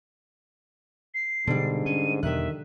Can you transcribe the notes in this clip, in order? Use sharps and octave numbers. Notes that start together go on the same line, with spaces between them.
C7
G#2 B2 D3 G3
C#4 D#7
E2 B2 D#3 G3 E5 F#6